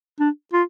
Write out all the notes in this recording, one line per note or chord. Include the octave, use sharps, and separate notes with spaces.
D4
F4